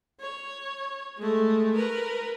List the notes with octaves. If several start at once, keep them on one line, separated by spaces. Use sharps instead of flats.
C#5
G#3 A3
A#4 B4